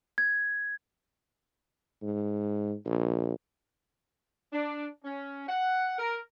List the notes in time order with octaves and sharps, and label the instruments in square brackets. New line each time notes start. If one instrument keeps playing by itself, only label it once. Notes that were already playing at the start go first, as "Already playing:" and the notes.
[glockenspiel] G#6
[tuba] G#2
A#1
[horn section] D4
C#4
F#5
A#4